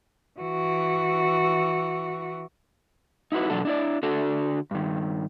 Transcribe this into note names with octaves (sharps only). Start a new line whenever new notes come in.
E3 F#4
D#4 E4 F#4 B4
E2 B2 F#3 D4 A4
D4 E4 D5
D3 D4 F#4 A4
G2 D#3